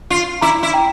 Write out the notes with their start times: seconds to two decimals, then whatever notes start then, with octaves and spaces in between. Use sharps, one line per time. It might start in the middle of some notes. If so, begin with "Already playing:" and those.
0.10 F4
0.41 E4 A#5 D6
0.63 E4
0.73 G5 A#5